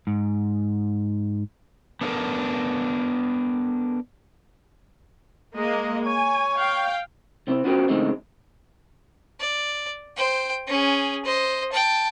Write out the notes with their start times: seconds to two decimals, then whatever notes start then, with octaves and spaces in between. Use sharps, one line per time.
0.07 G#2
2.01 B3 D4 E4 F4 A4 A#4
5.56 G#3 A#3 D#5
6.06 C#5 G#5
6.58 F5 G5
7.47 C3 C4 E4
7.64 B3 C#4 F4 F#4 C5 G5
7.89 C#3 E3 G#3 A3 C4 D#4
9.40 D5
10.17 C5 G5
10.68 C#4 G#4
11.25 C5 D#5
11.72 G5 A5